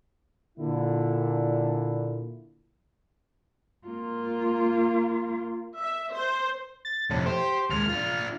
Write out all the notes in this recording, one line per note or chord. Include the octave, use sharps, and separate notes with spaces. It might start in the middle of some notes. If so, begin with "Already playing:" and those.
A#2 D3 E4
A#3 F4
E5
C5
A6
F2 A2 C3
G4 C5
D#2 G#3 F6
D4 F4